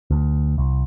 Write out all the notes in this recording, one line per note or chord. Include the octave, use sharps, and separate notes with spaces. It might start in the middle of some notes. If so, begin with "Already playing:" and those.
D2
C2